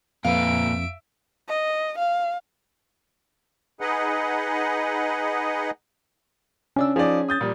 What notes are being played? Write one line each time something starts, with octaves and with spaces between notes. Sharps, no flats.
F2 A#2 B4 E5 F5 D7
D#5
F5
D#4 G#4 B4 D#5 F#5
C#3 C#4 D4 E6
F3 D#4 G#4 D5
D#6 G6 A6
A#2 G3